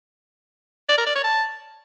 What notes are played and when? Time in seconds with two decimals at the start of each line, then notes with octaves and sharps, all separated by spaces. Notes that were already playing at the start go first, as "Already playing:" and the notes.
0.89 D5
0.98 A#4
1.07 D5
1.15 C#5
1.24 A5